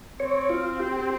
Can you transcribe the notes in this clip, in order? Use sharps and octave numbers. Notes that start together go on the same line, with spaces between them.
C4 C#5
F4
G4
G4